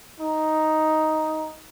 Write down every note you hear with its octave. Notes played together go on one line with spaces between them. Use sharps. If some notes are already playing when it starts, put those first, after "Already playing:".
D#4